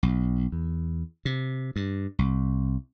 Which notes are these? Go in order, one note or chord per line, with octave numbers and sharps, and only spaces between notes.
B1
E2
C3
G2
C2